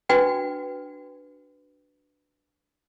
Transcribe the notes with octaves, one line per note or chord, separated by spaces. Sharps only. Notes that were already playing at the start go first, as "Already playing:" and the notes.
D4 F#4 B4 G5